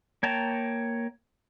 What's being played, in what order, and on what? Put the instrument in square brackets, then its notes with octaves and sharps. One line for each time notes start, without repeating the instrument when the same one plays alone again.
[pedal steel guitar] A#3 C#5 G5 A5 A#5